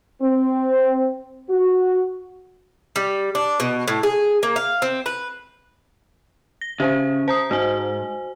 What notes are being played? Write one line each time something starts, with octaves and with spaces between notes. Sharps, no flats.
C4
F#4
G3
D4
B2
A2
G#4
A#3
F5
C4
B4
A#6
C#3 G4 C5 E5
C5 A#5 D#6
G#2 F#4 C5 G#5